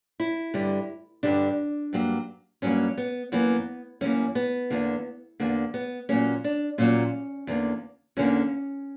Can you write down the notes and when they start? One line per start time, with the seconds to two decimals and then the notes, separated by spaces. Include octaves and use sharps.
0.20 E4
0.54 G2 D3 G3
1.23 G2 D3 G3 D4
1.93 G2 F#3 A#3
2.62 G2 F#3 A#3 C#4
2.98 B3
3.32 F#2 E3 A#3 B3
4.01 F#2 E3 A#3 C#4
4.35 B3
4.70 E2 D3 A#3
5.40 E2 D3 A#3
5.74 B3
6.09 A#2 F#3 A#3 C#4
6.44 D4
6.78 A#2 F#3 A#3 C#4
7.47 E2 D3 A#3
8.17 E2 D3 A#3 C#4